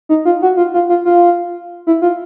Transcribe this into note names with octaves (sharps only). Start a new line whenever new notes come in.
D#4
F4
F#4
F4
F4
F4
F4
E4
F4